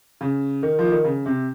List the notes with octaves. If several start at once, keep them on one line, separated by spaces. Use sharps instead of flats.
C#3
D#3
F3
D#3
C#3
C3